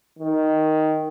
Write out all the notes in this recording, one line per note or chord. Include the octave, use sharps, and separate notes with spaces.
D#3